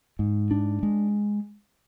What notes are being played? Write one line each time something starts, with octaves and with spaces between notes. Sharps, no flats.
G#2
D4
G#3